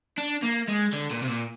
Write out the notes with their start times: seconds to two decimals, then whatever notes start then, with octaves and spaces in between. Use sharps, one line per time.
0.18 D4
0.43 A#3
0.68 G#3
0.93 D3
1.11 A#2
1.23 C3
1.29 A#2